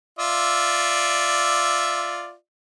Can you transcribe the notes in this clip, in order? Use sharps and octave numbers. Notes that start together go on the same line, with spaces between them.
F4 D5 E5